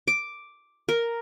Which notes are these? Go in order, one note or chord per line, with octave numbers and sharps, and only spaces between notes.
D6
A#4